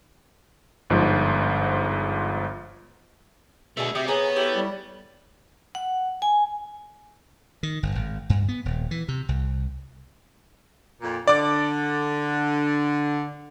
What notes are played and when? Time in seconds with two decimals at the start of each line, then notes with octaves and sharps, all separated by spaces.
0.90 G1 G#2 F3
3.77 B2 A3 D4 G#4 E5 G#5
3.95 C3 G4 E5 D#6
4.08 B3 G#4 C#5 G#5 A#5
4.36 A3 E4 G4
4.56 G3
5.75 F#5
6.22 G#5
7.63 D#3
7.83 G1
7.95 G#1
8.30 G2
8.48 B3
8.65 D#1
8.91 E3
9.08 C3
9.29 C2
11.02 F2 A#2
11.27 D3 D5 D6